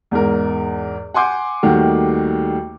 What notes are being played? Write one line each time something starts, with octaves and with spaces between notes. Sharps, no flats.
E2 G#2 A#4
F#5 G#5 C6 D6 G6
D#2 D#3 G3 A3 F#4